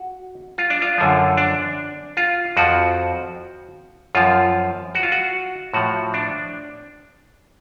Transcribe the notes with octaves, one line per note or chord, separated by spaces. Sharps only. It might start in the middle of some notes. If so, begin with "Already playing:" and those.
Already playing: F#4
F4
D4
F4
F#2 D3 F3
D4
F4
F2 F3 F#4
F#2 F3 F4
F#4
F4
F#4
A2 F3 F#4
D4